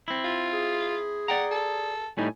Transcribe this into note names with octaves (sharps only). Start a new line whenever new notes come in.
C4 E4
F4
G#4
D5 F#5 G5 A#5
A4
A2 G3 D#4 G#5